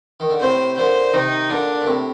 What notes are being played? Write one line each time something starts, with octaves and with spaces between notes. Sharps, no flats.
D#3
D3
A2 C3 C5
A#2 D3 C5
C3 D#3 D#4
A#2 D3 D4
A#2
A2 C3